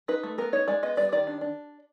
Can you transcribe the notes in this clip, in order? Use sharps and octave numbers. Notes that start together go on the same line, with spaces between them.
D#4 B4
A3
B3 A#4
D#4 C#5
G#3 D5
B3 D#5
G3 D5
D#3 D5
D4
D4